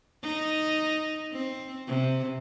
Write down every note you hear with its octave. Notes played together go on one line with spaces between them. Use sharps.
D#4
C4
C3